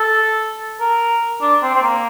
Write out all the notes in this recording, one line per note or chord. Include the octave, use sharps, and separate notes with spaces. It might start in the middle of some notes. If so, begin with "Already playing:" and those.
Already playing: A4
A#4
D4
C4
C4
A#3